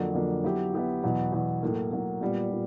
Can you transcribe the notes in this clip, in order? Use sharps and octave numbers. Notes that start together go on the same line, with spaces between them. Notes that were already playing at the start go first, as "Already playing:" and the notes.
Already playing: F2 D3 F#3 A#3
F2 D3 F#3 A#3 D4
F#3 B3 E4 G4
F#3 B3 E4 G4
E2 B2 F#3 B3
E2 B2 F#3 B3
A2 F#3 A#3
A2 F#3 A#3
A#2 G3 B3
A#2